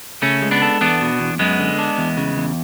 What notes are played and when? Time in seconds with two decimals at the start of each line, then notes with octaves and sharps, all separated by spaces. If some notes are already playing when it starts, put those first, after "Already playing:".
0.22 C#3 A3 C#4
0.42 G#3
0.51 B3 D4
0.62 A4
0.81 E2 B3 D4
1.01 B2
1.20 E2
1.39 F#2 G#3 B3
1.59 D3
1.78 D4
1.98 E2
2.17 C#3
2.37 E2